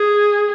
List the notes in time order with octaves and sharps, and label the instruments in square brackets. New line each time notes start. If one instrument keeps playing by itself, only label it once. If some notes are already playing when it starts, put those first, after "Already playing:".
Already playing: [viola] G#4